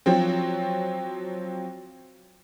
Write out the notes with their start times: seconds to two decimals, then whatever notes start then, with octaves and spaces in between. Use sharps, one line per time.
0.06 F3 F#3 C4